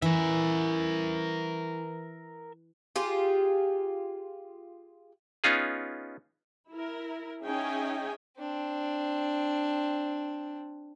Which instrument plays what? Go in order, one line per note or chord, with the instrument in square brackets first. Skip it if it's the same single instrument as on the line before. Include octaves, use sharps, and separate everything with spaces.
[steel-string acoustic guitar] E3 [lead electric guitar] A#4 E5
[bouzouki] F4 G4 G#4
[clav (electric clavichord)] B3 C#4 D#4 F4 G#4
[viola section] E4 A#4
C#4 D#4 G#4 E5 G5 G#5
[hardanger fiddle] C4 D4